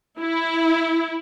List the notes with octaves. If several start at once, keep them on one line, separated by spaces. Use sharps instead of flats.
E4